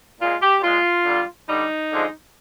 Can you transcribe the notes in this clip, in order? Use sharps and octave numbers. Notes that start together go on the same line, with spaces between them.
A#2 G#3 F4
G4
A#2 G#3 F4
D3 G3
D3 G3 D#4
D3 F3 G#3